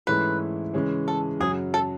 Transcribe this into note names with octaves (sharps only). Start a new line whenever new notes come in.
G#2 E3 A3 C#4 E4 B4
C#3 E3 G#3 C#4 G#4
A4
F#2 C#3 F#3 G#4
A4